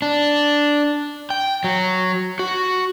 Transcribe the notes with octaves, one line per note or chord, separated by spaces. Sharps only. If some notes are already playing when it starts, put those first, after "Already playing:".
D4
G5
F#3
F#4